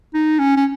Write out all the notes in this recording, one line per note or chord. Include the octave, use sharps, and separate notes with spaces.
D#4
C#4
C#4